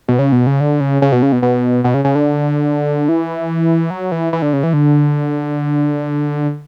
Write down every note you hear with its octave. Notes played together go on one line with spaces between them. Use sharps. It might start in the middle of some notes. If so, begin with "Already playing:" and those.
B2
C#3
B2
C#3
D3
C#3
C#3
B2
C#3
B2
B2
B2
C#3
C#3
D3
E3
F#3
E3
E3
D3
C#3
E3
D3